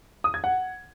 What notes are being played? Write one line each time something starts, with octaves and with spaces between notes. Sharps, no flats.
D#6
G#6
F#5